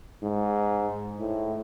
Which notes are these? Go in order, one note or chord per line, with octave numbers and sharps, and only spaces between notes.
G#2
A2